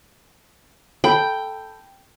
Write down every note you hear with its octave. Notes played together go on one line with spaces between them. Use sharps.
A4 G5 A5 B5